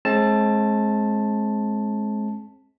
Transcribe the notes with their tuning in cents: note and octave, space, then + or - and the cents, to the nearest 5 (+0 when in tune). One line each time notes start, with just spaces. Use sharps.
G#3 +30 C4 +40 A5 +0